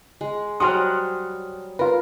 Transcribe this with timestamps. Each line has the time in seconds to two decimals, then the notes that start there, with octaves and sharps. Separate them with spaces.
0.21 G#3
0.60 F#3 G3 C5 F#5 G#5 C6 D#6 F6
1.79 F4 A#4 B4